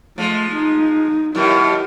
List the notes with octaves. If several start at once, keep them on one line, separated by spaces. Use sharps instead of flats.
F3 G#3 A3
D#4
F#2 B2 D#3 E4 G4